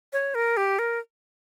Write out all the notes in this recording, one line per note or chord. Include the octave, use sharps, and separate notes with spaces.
C#5
A#4
G4
A#4